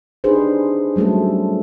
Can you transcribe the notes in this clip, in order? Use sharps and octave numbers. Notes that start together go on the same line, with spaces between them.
D4 D#4 G4 G#4 B4 C5
F#3 G3 A3 C#4 A4